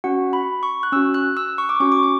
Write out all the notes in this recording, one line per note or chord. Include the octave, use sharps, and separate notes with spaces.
C#4 F#4 F#5
B5
C#6
F#6
C#4 F#4 E6
F#6
E6
C#6
D6
C#4 F#4 C#6
D6
C#6